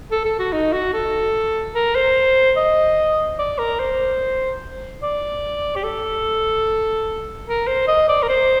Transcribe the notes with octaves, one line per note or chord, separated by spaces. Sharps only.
A4
A4
F#4
D#4
F#4
A4
A#4
C5
D#5
D5
A#4
C5
D5
G4
A4
A#4
C5
D#5
D5
A#4
C5